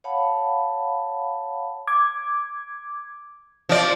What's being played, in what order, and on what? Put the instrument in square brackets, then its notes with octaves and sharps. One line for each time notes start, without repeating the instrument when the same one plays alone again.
[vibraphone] C#5 F5 F#5 A5 B5
[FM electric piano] D6 G#6
[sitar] F3 D5